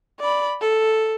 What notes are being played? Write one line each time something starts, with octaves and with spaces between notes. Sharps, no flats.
D5 B5
A4